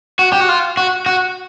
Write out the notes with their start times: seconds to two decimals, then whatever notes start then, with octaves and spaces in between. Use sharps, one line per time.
0.19 F#4
0.32 G4
0.40 F#4
0.49 F4
0.77 F#4
1.06 F#4